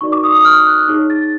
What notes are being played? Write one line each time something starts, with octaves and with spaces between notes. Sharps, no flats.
D#4 F#4 A#4 D5 C#6
D6
D#6
D#6
F6
F#6
D#4 G#4 C#5
A6